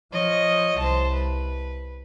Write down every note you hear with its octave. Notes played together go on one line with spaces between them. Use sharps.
F3 C#5 D#5
C2 C5 A5
B4